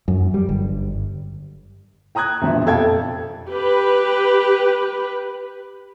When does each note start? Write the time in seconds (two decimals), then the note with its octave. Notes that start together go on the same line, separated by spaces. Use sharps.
0.08 F#2
0.34 G3
0.49 G1
2.15 G5 A#5 D#6 F#6 G#6
2.42 A#1 B2 F3 E5
2.66 F2 C3 A4 F5 G5 G#6
3.48 G4 B4